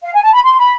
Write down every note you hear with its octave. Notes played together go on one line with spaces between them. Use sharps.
F5
G#5
A5
B5
C6
B5